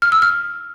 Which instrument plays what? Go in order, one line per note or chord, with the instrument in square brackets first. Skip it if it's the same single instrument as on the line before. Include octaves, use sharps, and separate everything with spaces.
[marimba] F6
E6
F6